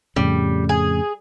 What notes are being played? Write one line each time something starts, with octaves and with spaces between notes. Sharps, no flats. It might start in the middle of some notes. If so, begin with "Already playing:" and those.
F2 A2 C#3 G3
G#4